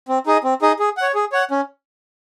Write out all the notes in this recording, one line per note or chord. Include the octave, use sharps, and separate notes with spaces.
C4
D#4 G#4 D#5
C4
D#4 G#4 D#5
G#4
C#5 F#5
G#4
C#5 F#5
C#4